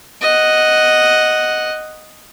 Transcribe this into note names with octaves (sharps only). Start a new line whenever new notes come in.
D#5 F#5